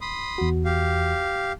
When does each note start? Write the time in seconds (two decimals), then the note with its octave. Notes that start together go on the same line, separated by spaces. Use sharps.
0.01 B5 C6 D#6
0.38 E2 F#4
0.65 G4 F5